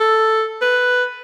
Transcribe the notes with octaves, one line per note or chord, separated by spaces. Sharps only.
A4
B4